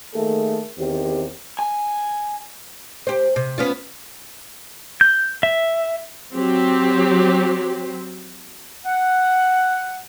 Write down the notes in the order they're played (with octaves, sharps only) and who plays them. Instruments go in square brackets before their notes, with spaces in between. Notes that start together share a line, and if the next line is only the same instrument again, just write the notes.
[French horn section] D#3 A3 A#3 G#4 A4
E2 D#3 C4 G4
[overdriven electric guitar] G#5
[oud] G4 C5
C3
B3 C#4 F4
[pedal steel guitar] G6
E5
[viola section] F#3 C4 G4
[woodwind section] F#5